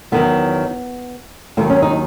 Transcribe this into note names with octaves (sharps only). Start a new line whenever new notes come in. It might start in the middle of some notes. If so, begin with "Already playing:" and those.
E2 D#3 F#3 B3
D#2 D#3 F#3 A#3
C#4
D#4